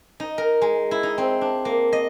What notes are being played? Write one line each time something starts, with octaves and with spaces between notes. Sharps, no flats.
D#4
A#4
G#3
E4
D#4
C4
D4
A#3
D#5